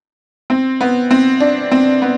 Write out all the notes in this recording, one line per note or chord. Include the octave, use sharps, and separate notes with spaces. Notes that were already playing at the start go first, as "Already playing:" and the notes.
C4
B3
C4
D4
C4
B3